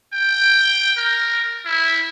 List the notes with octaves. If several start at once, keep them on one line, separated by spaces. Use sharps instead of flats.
G5
A#4
E4